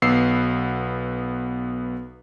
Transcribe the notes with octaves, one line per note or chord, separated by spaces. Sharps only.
B1 B3 E6 C7